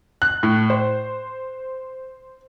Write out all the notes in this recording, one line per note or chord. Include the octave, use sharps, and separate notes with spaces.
F#6
A2
C5